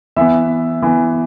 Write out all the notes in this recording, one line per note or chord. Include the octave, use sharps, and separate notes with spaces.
E3 B3 E5
E3 B3